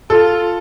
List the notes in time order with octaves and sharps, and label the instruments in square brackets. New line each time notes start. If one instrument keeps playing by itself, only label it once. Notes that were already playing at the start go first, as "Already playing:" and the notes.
[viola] F4 [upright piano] A4